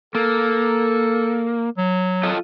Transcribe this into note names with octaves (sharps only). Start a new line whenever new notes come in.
A#3 A4
F#3
F4 A4 D#5